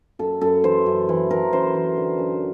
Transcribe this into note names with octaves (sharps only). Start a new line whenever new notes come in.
F#2 A4
F#2 A4
E3 C5
F#2
E3
E3 A#4
F#2 C5
E3
D3
F#2